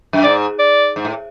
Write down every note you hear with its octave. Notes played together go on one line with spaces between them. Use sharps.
F#2
G#2 D5
D5
G#2
A2